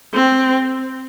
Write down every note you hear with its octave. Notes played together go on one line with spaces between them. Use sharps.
C4